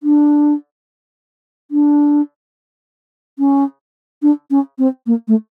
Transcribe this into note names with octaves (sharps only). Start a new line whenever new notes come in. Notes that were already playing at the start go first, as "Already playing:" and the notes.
D4
D4
C#4
D4
C#4
C4
A#3
A3